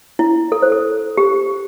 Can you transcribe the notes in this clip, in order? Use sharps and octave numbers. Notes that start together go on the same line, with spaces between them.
E4
A4
C5
A4
G4